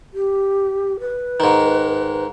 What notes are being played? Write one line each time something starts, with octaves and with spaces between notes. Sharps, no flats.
G4
B4
G#2 D#3